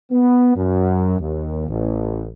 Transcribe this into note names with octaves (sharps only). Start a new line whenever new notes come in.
B3
F#2
D#2
A1